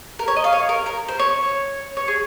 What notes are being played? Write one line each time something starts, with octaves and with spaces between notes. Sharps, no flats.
A#4
C#5
D#5
F5
C#5
A#4
A#4
C5
C#5
C#5
G#4